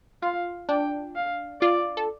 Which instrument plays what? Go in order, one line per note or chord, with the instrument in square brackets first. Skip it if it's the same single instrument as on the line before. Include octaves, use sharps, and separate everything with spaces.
[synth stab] F4 [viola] F5
[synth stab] D4 [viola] G5
[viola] F5
[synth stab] F4 [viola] D5
[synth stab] A4